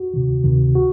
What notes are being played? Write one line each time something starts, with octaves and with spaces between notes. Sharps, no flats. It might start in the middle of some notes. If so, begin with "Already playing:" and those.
Already playing: F#4
D2 C3 D#3
D2 C3 D#3
F#4